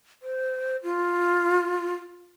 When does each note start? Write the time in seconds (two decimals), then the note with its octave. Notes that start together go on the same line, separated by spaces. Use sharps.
0.23 C5
0.84 F4